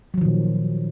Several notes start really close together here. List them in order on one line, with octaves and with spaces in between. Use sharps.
F#3 F3 D#3 A#2